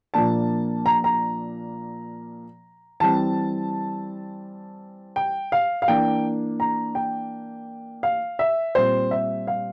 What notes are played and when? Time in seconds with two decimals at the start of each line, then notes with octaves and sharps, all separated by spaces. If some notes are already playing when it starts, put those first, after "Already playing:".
0.14 A#2 F3 A#3 D4 A5
0.86 A#5
1.04 A#5
3.00 E3 G3 C4 A5
5.16 G5
5.52 F5
5.82 F5
5.87 E3 A#3 D4 G5
6.60 A#5
6.95 G5
8.03 F5
8.39 E5
8.75 A#2 G3 C4 C5
9.11 E5
9.47 F5